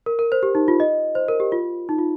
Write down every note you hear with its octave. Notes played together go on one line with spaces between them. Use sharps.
A#4
A#4
C5
G4
D#4
F4
D#5
C5
A#4
G4
F4
D#4
F4